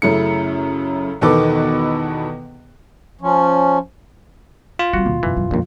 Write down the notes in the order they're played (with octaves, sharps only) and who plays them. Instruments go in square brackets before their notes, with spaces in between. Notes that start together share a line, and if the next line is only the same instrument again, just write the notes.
[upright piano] F#2 C#3 A3 E4 C#7
E2 B2 D#3 A4 B4 D6
[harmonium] F3 C#4
[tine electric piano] F4
[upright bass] G3 C4 [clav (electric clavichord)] F#4
[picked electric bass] D#1 D#3 A#3 [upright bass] B2
[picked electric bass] E1 F#2 B2 [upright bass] D3 [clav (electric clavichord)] E3
[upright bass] D#3 F#3
[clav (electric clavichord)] A#1 D#2 [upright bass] F3